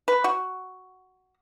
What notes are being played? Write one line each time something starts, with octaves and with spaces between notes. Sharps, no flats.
B4
F#4